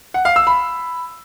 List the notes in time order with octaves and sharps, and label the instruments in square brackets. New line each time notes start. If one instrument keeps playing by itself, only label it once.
[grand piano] F#5
F5
E6
B5